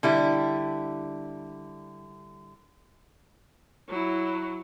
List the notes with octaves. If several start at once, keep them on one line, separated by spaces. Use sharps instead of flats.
D3 G3 E4
F#3 E4